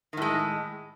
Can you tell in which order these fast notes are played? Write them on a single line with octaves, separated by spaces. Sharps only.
D#3 A2 G#3